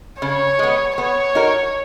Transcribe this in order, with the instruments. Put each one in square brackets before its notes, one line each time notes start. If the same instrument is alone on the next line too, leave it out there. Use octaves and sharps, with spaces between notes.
[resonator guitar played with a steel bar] C#3 [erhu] C#5
[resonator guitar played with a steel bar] G#3 B3
[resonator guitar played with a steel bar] B3 [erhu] C#5
[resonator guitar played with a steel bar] D#4 F#4 A#4